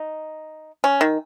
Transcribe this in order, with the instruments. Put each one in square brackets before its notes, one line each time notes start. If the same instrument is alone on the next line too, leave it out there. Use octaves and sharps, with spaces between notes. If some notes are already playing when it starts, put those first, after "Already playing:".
Already playing: [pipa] D#4
C#4
D#3